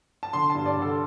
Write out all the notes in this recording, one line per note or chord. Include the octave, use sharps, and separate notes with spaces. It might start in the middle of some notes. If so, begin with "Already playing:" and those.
A5
D3 C6
G2 A5
D5
D3
A4